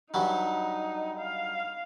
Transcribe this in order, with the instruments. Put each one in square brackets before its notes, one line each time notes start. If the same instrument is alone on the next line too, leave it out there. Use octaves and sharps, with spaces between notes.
[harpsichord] G2 F#3 G3 [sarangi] D#4
[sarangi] F5